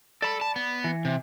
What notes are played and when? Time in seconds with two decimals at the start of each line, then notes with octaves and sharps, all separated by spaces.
0.22 A4 D5 B5
0.41 A5
0.56 B3
0.84 E3
1.05 C3